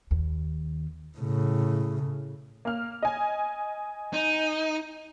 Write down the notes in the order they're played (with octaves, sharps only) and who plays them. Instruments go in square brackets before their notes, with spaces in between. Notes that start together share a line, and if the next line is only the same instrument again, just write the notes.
[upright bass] D#2
[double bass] A2 C#3
[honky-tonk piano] A#3 F6
D#5 G#5
[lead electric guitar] D#4